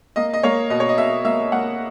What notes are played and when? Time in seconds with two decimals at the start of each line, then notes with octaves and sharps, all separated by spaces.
0.16 A#3 D#5
0.34 D#5
0.43 A#3 C#5
0.70 B2 D#5
0.80 C#5
0.89 D#5
0.97 B2 E5
1.25 A#3 E5
1.52 A#3 F#5